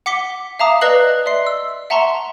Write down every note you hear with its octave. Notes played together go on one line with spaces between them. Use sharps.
F#5 D6 B6 G7
E5 F5 A5 A#5 D6 D#6
B4 D5 D#5 F#6 C7 F#7
D5 E5 C6 C7
E6
E5 F#5 A5 A#5 C6 C#6